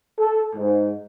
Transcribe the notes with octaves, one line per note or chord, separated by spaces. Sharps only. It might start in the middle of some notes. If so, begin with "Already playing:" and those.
A4
G#2